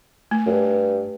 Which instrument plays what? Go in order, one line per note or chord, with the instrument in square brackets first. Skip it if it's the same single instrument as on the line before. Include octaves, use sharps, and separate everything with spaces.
[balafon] A3
[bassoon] F#2
G2